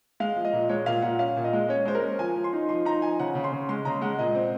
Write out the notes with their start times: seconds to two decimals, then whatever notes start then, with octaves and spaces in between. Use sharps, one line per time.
0.20 G#3 F5
0.36 F3
0.45 D#5
0.53 A#2
0.69 G#3 C#5
0.86 A#2 F5
1.02 A#2 F#5
1.19 C#4 F5
1.36 A#2
1.44 D#5
1.53 G#3
1.69 C#4 C#5
1.85 G#3 C5
1.95 A#4
2.02 C#4
2.19 F3 G#5
2.36 F3
2.44 C6
2.53 D#4
2.69 F3 C6
2.85 D#4 A#5
3.02 F3 G#5
3.19 C#3 F#5
3.35 C#3
3.44 C6
3.52 C#3
3.69 G#3 C6
3.85 C#3 A#5
4.02 G#3 F#5
4.19 A#2 D#5
4.35 C4